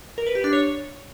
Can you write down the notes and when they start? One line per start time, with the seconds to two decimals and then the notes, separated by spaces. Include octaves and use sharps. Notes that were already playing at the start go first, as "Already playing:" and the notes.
0.18 A#4
0.27 B4
0.35 G4
0.44 D4
0.53 C#5